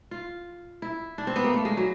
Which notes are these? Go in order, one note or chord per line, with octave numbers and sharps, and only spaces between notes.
F4
E4
D4
C4
B3
A#3
A3
G#3
F#3